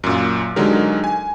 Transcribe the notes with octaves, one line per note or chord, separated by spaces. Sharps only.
F#2 A#2
D3 F#3 G#3 D#4 G4 A#4
G#5